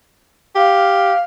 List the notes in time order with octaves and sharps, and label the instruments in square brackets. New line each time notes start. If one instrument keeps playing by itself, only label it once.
[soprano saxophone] G4 [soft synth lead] F5